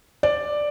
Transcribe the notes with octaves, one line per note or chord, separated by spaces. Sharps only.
D5